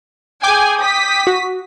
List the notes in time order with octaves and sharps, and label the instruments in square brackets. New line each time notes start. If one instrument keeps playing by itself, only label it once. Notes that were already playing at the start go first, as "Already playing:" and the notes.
[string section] G#4 G#5 [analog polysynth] G5 D6 G6
[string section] D#6 B6
[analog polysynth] F#4